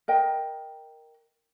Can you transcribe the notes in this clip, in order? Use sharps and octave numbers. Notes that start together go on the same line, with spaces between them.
A#4 D#5 G5